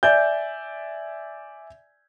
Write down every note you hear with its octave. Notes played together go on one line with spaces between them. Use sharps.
D5 E5 G#5 G6